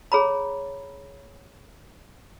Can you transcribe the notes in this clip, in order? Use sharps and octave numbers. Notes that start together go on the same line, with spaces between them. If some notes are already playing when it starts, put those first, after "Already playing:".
G#4 C#5 A#5 B5